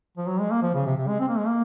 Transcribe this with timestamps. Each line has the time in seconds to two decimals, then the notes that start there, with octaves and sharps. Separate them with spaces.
0.17 F3
0.29 F#3
0.40 G#3
0.51 A#3
0.63 F3
0.74 C#3
0.86 C3
0.97 C3
1.08 G#3
1.20 C4
1.29 A#3
1.38 G#3
1.47 A#3